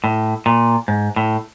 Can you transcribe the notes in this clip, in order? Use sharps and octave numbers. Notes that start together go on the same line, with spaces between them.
A2
A#2
G#2
A2